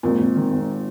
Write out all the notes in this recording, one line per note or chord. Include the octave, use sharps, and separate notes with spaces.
G#1 A#2
G#1
D#3
G#1